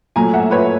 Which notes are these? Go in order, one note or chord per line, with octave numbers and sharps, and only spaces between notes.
A#2 F#3 A3 G#5 A#5
E5 F#5
B4 C#5